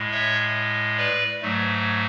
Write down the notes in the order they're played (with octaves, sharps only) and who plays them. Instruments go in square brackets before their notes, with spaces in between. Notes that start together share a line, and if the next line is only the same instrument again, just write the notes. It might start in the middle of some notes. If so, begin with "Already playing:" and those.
Already playing: [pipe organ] A2 G#3
C#5 E5
B4 D5
G#2 F#3 A3